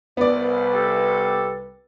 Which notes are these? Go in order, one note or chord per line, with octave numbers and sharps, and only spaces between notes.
C2 B3 B4 D5
G4 A4